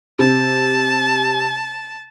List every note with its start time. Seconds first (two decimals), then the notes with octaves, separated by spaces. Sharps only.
0.19 C3 A5